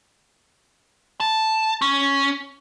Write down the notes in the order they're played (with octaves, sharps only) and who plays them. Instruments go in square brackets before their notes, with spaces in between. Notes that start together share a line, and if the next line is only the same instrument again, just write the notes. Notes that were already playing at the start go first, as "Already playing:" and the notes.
[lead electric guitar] A5
C#4